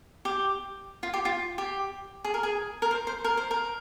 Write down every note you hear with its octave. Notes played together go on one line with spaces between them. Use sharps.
G4
F4
G4
F4
G4
G#4
A#4
G#4
A#4
C5
C5
A#4
C5
A#4